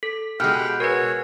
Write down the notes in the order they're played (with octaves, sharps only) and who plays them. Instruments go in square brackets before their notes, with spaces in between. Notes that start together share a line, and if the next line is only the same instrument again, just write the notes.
[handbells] A4 [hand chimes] B6
[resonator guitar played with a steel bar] B2 G#3 [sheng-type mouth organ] G4 F#5 G5 [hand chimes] F6
[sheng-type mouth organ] F#4 G#4 C#5 [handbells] A#4 B4